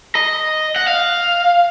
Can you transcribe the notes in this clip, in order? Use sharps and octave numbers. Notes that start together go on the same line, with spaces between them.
D#5
F#5
F5